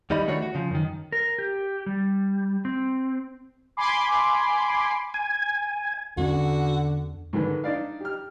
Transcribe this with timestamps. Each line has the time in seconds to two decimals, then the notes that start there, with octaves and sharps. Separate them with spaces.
0.10 D#2 G3 D#4 D#5 B5
0.26 D#3 E3 A3 D4 F#4 C#5
0.42 F#4
0.55 C#3 F3
0.71 F#2 D#3
1.12 A#4
1.39 G4
1.86 G3
2.65 C4
3.77 G#5 B5 C6 D6
5.14 G#5
6.17 E2 D3 A#3 C#4 F#4
7.33 G#2 D3 D#3 B4
7.64 D4 D#4 D5 F5
8.01 G4 F6